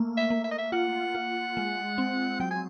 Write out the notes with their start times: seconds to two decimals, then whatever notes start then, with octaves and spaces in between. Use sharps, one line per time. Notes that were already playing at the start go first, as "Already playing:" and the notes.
Already playing: A3 A#3
0.17 E5
0.30 A#3
0.44 E5
0.51 D#5
0.58 E5
0.72 F4 F#5
1.15 F4
1.57 G#3
1.98 C4
2.40 F#3 G5
2.51 G#5